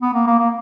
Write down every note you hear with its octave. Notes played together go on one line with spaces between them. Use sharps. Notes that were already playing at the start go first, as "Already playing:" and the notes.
B3
A#3
A#3
A#3